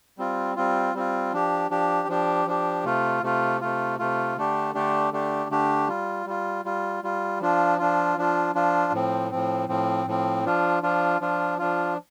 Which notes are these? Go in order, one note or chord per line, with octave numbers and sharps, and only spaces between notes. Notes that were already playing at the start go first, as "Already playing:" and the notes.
G3 C4 F4
G3 C4 F4
G3 C4 F4
F3 D4 G4
F3 D4 G4
F3 D4 G4
F3 D4 G4
C3 A3 F4
C3 A3 F4
C3 A3 F4
C3 A3 F4
D3 A3 D4 G4
D3 A3 D4 G4
D3 A3 D4 G4
D3 A3 D4 G4
G3 F4
G3 F4
G3 F4
G3 F4
F3 D4 F4
F3 D4 F4
F3 D4 F4
F3 D4 F4
A2 F3 C4
A2 F3 C4
A2 F3 C4
A2 F3 C4
F3 D4 F4
F3 D4 F4
F3 D4 F4
F3 D4 F4